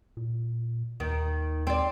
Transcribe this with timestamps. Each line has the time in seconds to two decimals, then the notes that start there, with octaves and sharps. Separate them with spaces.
0.17 A#2
1.00 D#2 D#3
1.67 C4 D5